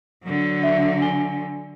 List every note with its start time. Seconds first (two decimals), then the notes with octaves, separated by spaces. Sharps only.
0.24 D3 F#3
0.63 E5
1.01 G#5 G7